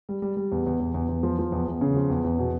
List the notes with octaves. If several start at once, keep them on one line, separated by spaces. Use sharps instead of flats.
G3
G3
G3
E2
E2
E2
E2
E2
F3
F3
E2
E2
C#3
F3
E2
E2
B2